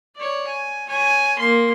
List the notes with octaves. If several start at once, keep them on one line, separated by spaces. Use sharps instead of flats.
C#5 D5
G#5
C#5 G#5
A#3 C6